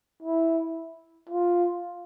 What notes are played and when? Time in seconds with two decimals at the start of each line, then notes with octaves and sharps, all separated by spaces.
0.22 E4
1.29 F4